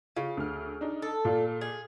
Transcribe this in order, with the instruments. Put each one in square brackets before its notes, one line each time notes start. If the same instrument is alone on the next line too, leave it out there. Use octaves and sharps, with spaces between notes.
[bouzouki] C#3 [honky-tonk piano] F4
[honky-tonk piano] D2 F6
D4 D#4
[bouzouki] A4
[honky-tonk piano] A#2 F4 D5
[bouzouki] G#4